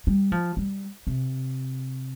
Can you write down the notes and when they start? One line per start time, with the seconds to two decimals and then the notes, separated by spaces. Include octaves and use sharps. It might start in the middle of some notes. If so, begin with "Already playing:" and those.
0.07 G3
0.32 F3
0.57 G3
1.07 C3